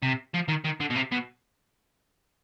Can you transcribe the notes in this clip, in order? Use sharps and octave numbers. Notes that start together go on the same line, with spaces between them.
C3
F3
D#3
D#3
D3
B2
C3
B2